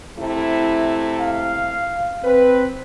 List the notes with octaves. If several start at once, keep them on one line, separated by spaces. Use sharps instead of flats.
C3 A3 E4
F5
C4 B4